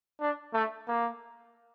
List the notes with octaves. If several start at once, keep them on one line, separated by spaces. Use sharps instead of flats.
D4
A3
A#3